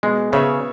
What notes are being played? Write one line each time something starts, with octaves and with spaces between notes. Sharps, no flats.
B2 G#3
C#3 B3 G#4 C#5 E5